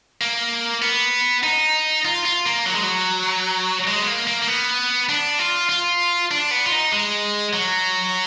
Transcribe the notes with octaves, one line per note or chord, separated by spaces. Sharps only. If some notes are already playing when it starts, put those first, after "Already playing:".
A#3
B3
D#4
F4
F4
A#3
F#3
G#3
F#3
G#3
B3
A#3
A#3
A#3
B3
D4
F4
F4
D4
B3
F4
D#4
G#3
F#3